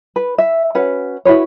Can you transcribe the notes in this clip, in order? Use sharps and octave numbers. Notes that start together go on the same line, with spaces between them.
B4
E5
C#4 F#4 B4 F#5
E4 F#4 B4 C#5